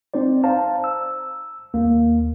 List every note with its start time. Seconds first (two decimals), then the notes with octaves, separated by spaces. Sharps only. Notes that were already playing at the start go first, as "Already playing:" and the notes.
0.14 C4 D#4 C5 D5
0.44 C5 F5 A5 A#5
0.84 E6
1.74 D#2 A#3